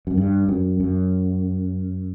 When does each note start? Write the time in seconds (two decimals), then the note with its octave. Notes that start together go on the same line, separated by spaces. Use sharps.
0.07 F#2
0.17 G2
0.48 F#2
0.80 F#2